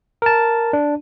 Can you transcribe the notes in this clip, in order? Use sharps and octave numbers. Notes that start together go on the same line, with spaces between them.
A#4 A5
D4